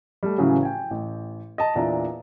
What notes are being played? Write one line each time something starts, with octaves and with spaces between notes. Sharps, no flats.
G3 A3
A2 C#3 E3 F#3 C#4
G5 G#5
A1
D#5 A5
E2 A#2 D4 D5 E5 A#5